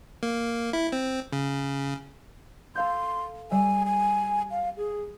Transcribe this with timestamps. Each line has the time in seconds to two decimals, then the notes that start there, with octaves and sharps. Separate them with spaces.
0.23 A#3
0.73 E4
0.92 C4
1.33 C#3
2.75 A4 F5 C6 G6
3.51 G3 E5 G#5
3.86 G#5
4.51 F5
4.77 G#4